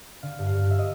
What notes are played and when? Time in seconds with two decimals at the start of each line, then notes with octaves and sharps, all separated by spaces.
0.22 D3 F5
0.39 G2
0.47 F5
0.55 G2
0.71 E5
0.79 D#5